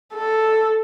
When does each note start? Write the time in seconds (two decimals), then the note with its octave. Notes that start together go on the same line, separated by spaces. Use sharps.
0.14 A4